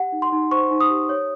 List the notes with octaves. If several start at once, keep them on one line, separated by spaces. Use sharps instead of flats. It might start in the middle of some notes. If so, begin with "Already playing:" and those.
Already playing: G4 F#5
D#4
C6
D#4
C5 C#6
D#4
D#6
G4
C#5